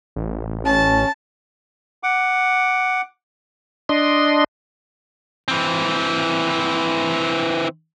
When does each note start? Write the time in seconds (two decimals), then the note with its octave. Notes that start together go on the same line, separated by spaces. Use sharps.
0.16 A1
0.65 C#4 A5
2.03 F#5 D6
3.89 D4 D#5 C6
5.48 E3 C4